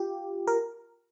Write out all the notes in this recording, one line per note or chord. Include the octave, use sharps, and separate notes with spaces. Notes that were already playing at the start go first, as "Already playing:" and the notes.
Already playing: F4 G4
A#4